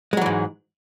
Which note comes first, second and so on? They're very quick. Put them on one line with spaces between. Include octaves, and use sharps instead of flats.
G#3 F#3 E3 G#2